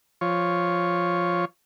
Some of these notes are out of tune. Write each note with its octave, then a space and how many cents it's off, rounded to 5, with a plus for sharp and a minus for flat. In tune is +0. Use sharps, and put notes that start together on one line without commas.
F3 +0 C#5 +0